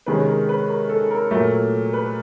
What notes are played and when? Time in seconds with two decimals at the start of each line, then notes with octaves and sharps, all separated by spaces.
0.06 C3 D#3 G#3 C#4 B4
0.27 A#4
0.49 B4
0.69 A#4
0.89 A4
1.11 A#4
1.31 A#2 F#3 A3 A#4
1.93 B4